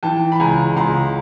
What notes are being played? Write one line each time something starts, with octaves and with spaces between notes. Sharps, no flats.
E3 G5 A5
B5
C#2 G#5 A#5
C#2 A#5 C6